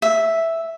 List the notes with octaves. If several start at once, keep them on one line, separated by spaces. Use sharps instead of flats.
E5